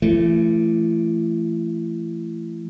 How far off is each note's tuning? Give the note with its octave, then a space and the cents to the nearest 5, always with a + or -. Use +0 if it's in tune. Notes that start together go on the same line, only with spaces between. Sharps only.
E3 +35 A3 +0